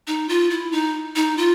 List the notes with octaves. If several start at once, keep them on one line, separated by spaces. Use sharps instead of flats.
D#4
F4
E4
D#4
D#4
F4